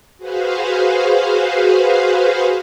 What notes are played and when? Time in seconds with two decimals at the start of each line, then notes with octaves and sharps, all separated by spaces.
0.18 F#4 G#4 B4 C5 F5